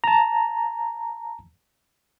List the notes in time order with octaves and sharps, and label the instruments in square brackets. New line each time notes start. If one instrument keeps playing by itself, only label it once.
[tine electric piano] A5 A#5